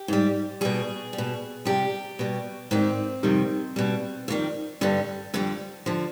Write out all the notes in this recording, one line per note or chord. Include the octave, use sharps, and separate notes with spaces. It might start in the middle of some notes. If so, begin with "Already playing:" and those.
Already playing: G4
G#2 G3
B2 G3 G#4
G3
B2
F2 C3 G3 G4
B2 G3
G#2 D#3 G3 C4
F2 C3 D#3 G3
B2 G3
F2 D#3 G3
G2 D3 G3
F2 D3 G3
D3 F3